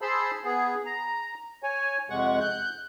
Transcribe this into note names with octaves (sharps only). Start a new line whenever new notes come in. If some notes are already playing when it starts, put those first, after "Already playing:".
G#4 C5 A5 B5 C6 E6
B3 G#4
A#5
C#5 G#5
F2 C3 G#3 F#5 C#6
F#6 G6